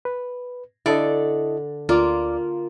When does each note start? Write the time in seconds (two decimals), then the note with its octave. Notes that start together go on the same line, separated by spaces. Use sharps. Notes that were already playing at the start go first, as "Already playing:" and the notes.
0.05 B4
0.86 D3 E4 A4 D5 D#5
1.89 D2 A#3 F4 D5 D6